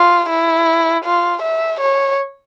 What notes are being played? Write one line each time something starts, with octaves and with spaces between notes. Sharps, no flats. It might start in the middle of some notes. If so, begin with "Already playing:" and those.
Already playing: F4
E4
F4
E5
C#5